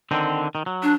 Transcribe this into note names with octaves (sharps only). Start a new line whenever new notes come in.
D3 D#3 C4
D#3
F#3
D4